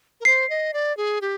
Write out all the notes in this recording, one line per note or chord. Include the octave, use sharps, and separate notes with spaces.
A#4
C5 C7
D#5
D5
G#4
G4